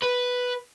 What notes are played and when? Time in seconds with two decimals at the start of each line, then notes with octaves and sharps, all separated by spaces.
0.03 B4